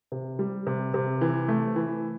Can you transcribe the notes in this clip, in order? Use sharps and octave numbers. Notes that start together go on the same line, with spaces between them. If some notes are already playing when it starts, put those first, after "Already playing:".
C3
G3
C3
C3
E3
A3
E3